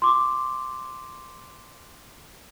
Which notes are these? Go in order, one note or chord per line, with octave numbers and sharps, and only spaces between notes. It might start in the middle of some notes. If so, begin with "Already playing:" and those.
C6 D6